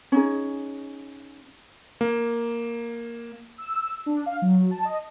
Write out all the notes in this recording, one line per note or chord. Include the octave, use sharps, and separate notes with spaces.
C#4 D#4 G#4
A#3
E6
D4
F5
F#3
A5
D#5